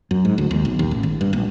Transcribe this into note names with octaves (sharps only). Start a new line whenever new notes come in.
F#2
G#2
D2
D#2
B1
D#2
A1
G#1
G2
A#1